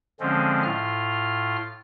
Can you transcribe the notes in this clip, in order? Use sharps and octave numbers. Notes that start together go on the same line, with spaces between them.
D3 F3 G#3 C4 C#4
A2 F4 F6